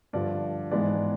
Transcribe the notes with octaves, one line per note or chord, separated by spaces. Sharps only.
G2 D3 F3 D5
G#2 E3 G#3 B3 D5